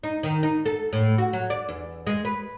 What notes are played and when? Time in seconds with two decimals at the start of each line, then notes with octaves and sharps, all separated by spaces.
0.04 D#4
0.23 D#3
0.43 D#4
0.66 A4
0.93 A2
1.18 F#4
1.33 F#3
1.50 D5
1.69 E2
2.07 G#3
2.25 B4